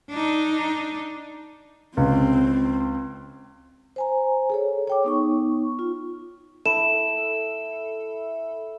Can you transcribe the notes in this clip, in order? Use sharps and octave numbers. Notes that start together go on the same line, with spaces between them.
D4 D#4
C#2 C4
C5 G#5 A#5
G#4 A4 C#5
C#5 G5 D6
B3 D#4 C#6
F4
E4 A4 E7